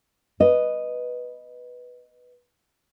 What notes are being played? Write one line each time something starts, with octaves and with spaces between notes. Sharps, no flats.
B4 D#5